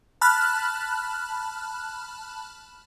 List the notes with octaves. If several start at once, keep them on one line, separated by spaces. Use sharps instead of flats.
A5 B5 F6 F#6